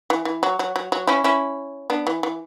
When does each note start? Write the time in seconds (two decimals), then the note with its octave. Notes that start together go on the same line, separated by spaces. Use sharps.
0.10 E3
0.25 E3
0.43 F#3
0.59 F#3
0.76 F#3
0.92 F#3
1.07 C#4 E4
1.24 C#4 E4
1.90 B3 D4
2.07 E3
2.23 E3